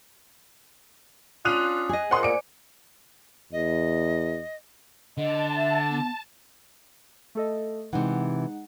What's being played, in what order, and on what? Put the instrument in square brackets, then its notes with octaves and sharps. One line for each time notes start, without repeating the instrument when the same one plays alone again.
[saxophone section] C#4 D4 F4 [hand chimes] D#6 [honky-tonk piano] F#6 D#7 F7
[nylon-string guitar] G#4 D#5
[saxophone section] A#2 [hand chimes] C5 [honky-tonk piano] F#5 C6 D#6
[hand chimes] D5 G#5 D6 [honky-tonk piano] C#7 D7
[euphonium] E2 [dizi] D#5
[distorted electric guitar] D3 [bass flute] D#5 [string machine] A5
[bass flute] E5
B3
[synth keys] A3 A4 D#5
[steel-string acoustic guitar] C3 E3 [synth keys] G#3 D#4 F#5